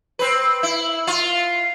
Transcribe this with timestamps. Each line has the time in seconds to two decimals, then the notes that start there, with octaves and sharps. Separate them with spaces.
0.19 C4 B4
0.63 E4
1.07 F4